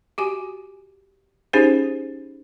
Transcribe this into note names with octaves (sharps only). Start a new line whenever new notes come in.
F#4 G4 G#5
C#4 D#4 G4 G#4 C5